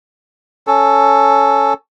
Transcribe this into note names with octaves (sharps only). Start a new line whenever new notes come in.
C#4 A4